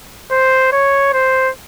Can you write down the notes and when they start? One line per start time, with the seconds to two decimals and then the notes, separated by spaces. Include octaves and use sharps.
0.31 C5
0.72 C#5
1.13 C5